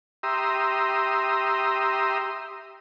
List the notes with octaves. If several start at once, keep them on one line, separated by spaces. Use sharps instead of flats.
G4 E5 A#5 C6 D#6